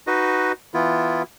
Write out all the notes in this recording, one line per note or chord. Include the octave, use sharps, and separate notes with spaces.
D#4 F#4 B4 D#5
E3 B3 E4 F4